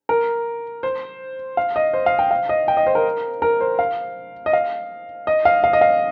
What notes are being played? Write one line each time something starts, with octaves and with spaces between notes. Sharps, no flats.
A#4
C5
F5
D#5
C5
F5
G5
F5
D#5
G5
D#5
C5
A#4
A#4
C5
F5
D#5
F5
D#5
F5
F5
D#5
F5